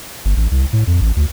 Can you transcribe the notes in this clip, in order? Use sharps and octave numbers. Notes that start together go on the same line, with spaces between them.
G1
A1
C2
A2
F2
A1
D2